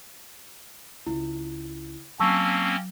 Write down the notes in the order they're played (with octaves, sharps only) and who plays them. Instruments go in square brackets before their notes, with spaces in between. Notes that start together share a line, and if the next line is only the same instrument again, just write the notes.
[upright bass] C#2 [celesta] E4
[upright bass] F#3 [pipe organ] A#3 C4 C#4 [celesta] A5 C#6 E6